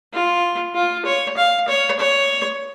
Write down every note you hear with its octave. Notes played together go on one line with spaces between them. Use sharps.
F4
F4
C#5
F5
C#5
C#5